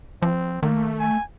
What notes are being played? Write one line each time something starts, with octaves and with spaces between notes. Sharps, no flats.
F3 C4
D#3 A3 A#3
G#5